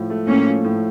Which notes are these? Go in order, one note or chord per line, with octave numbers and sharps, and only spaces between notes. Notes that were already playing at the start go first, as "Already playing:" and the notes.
Already playing: A2 F3
A3
A2 A#3 C#4
F3
A2